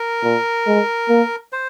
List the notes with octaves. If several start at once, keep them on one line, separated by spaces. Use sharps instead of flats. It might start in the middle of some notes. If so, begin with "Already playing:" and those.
Already playing: A#4
A#2
G#3
A#3
C5